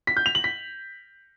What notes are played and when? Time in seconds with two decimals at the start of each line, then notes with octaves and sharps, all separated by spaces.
0.07 B6
0.17 G6
0.26 F7
0.35 F#7
0.44 B6